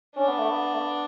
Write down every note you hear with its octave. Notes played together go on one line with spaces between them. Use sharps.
C#4 D4
B3
A3
B3
A3
B3